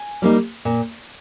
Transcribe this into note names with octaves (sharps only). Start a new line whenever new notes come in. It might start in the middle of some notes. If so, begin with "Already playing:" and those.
Already playing: G#5
G3 A#3 D#4
A#2